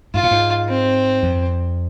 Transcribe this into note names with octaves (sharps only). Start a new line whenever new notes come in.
G#2 F4
A#2
G#2
C4
F2